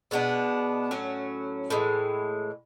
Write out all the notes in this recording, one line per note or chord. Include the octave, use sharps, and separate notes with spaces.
B2 G#3 B3 D4
A2 F#3 C#4
A2 E3 G#3